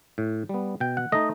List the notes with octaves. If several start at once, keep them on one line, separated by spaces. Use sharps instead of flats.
A2
G3 B3
B2 G5
F#5
A3 D#4 D#5